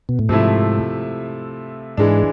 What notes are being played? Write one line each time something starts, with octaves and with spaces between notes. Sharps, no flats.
B2
A2
G#2 C3 F3 A3 E4
G#2 E3 G#3 D4